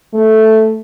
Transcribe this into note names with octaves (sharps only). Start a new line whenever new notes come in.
A3